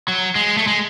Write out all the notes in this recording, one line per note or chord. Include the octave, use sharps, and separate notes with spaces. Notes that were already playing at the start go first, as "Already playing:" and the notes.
F#3
G#3
A3
G#3